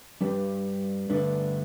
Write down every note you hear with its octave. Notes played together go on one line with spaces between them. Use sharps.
G2 G3 D4 G4 B4
G2 D3 A3 D4 B4